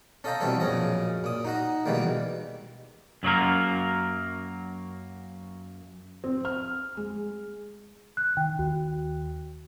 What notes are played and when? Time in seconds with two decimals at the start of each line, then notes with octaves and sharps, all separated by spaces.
0.24 C#4 A4 D#5 F5 G5 A#5
0.40 B2 E3 G3 C4 C#4 A4
0.60 A#1 F#2 C#3 C#4 D#5
1.24 A#2 D#6
1.45 D#4 F#4 A#5
1.86 B2 D#3 E3 G3 G#3 A#3
3.23 F#2 F#3 A#3 A#4
6.24 C4
6.45 F6
6.97 G#3
8.17 F#6
8.37 D#3 G5
8.59 D#2 F#4